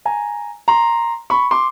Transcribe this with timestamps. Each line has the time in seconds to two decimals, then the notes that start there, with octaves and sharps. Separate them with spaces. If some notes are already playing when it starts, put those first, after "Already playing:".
0.05 G#5 A#5
0.68 A#5 C6
1.30 B5 C#6
1.51 C6 D6